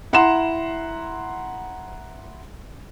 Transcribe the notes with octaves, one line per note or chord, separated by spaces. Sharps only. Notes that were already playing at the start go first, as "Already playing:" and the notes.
E4 F#5 A#5 C6 E7